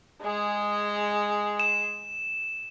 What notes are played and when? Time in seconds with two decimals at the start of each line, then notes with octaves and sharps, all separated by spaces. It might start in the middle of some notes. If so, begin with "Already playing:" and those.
0.22 G#3 G#4
1.60 E7